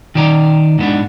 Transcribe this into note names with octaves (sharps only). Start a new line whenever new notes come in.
D#3 D5 A#5
G#2 B3 D4